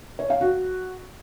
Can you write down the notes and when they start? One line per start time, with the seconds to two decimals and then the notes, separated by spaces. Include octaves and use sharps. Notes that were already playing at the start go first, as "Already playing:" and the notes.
0.19 C#5
0.30 F5
0.41 F#4